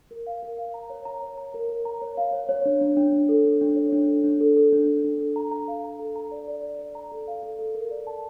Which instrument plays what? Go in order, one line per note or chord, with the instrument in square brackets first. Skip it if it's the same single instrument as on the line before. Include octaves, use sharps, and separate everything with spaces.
[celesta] A#4
F5
A#4
F5
A#5
C#5
A#5
C#5
A#5
A#4
A#4
A#5
C#5
F5
C#5
C#5
D4
D4
D4
D4
A4
D4
D4
C#5
D4
A4
D4
A4
A4
D4
D4
D4
A4
A#5
A#5
F5
A#5
A4
A#5
D5
D5
D5
D5
A#5
A4
F5
A4
A4
A#4
D5
A5